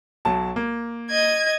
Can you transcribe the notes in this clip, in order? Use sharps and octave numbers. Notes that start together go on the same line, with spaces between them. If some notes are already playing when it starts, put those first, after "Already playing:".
B1 F#3 A5
A#3
D#5 G#6